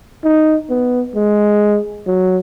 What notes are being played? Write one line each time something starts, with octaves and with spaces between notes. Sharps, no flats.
D#4
B3
G#3
F#3